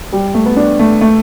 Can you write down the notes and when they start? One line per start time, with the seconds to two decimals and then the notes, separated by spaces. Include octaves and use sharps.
0.13 G3
0.34 A3
0.46 B3
0.56 D4
0.79 A3
1.01 A3